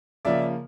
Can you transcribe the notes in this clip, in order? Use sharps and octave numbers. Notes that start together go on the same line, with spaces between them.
C#3 F3 A#3 D5 E5